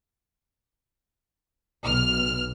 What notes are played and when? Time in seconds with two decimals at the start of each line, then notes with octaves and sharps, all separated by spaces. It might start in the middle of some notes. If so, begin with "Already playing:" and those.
1.83 B1 F6